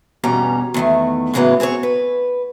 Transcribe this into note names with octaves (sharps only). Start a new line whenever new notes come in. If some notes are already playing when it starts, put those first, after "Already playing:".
E2 G2 B2 G3 C#4 A#5
E2 D#3 A3
A2 C#3 E3 F#3 G#3 B3
C4 G#4 B4 C#5
B4